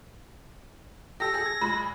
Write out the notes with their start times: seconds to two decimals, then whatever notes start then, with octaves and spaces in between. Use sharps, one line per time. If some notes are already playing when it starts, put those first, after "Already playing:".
1.20 G4 A4 E6 A#6
1.34 G#4 A4
1.46 G#6
1.61 A#2 G#3 B5